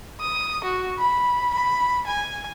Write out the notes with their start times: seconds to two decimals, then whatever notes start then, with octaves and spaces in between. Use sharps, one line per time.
0.21 D#6
0.64 F#4
0.99 B5
1.54 B5
2.07 G#5